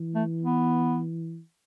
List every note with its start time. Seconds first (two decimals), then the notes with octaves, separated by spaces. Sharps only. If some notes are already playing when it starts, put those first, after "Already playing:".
Already playing: E3
0.15 A3
0.43 B3